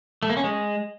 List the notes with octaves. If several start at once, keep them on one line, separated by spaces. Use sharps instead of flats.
A3
A#3
C#4
G#3